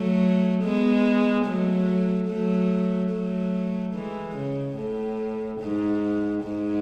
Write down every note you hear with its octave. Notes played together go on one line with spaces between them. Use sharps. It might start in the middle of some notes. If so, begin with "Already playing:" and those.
Already playing: F#3 A3
G#3 B3
F#3 A3
F#3 A3
F#3 A3
E3 G#3
C#3
A2
G#2
G#2